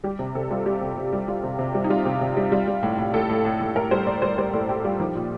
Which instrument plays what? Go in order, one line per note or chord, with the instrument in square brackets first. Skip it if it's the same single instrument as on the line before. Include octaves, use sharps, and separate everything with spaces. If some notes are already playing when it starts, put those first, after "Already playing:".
[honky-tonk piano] G3 G4
C3
C3 A4
G3 F4
G3 G4
C3
C3
G3
G3 F4
C3
C3
G3
D#4
G3 F4
C3
C3
G3
G3 F4
G3
A2
A2
A2 A4
A2
A2
A2
A2 A#4
G3 C5
A2 D5
G3 C5
G3 C5
A2 A4
A2 G4
G3 F4
F3 D#4
A#2